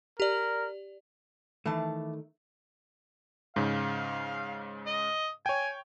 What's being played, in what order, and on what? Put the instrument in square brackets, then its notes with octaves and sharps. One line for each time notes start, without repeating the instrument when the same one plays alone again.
[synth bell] G4 D5 [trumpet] A#4
[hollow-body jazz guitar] D#3 A3 [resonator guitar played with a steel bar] E3 A5
[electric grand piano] G#2 C#3 [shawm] F5
[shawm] D#5
[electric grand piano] C#5 G5 [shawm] G#5